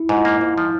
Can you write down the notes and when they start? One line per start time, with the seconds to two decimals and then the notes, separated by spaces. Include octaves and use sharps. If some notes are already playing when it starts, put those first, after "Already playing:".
Already playing: E4
0.09 G#2
0.18 F4
0.25 A#3
0.41 G#2 F4
0.58 F3